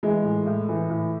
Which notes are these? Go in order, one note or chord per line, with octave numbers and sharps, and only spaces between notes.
E3 G#3
A2
A2
E3
A2